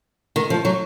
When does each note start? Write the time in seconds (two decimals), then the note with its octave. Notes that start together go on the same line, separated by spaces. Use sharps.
0.36 D#3
0.50 F3
0.65 F#3